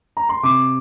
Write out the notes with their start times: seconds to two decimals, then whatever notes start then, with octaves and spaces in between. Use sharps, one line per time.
0.17 A#5
0.29 C6
0.43 C3 D6